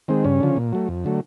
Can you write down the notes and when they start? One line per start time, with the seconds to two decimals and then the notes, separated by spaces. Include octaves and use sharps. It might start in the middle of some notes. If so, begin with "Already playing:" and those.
0.08 D#3 G#3 C4
0.24 G2 C#3 C#4
0.40 D3 F3
0.57 A#2
0.73 F#3 A3
0.89 F2
1.04 D3 F#3 A3